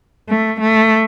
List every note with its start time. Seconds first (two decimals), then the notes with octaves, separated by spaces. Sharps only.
0.29 A3
0.60 A3